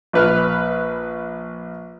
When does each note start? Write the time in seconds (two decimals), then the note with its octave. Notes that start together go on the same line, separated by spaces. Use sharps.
0.13 A#1 B4 F6